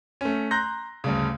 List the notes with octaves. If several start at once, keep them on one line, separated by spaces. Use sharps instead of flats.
A3 C#4
A#5 C6 F#6 G6 A#6
D2 G2 C#3